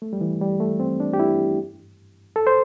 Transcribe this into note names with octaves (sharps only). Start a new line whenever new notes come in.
A3
G3
E3
G3
A3
C4
D4
G4
E4
A4
C5